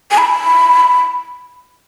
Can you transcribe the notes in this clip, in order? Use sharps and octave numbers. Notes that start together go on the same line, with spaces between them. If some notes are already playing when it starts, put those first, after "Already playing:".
G#5
B5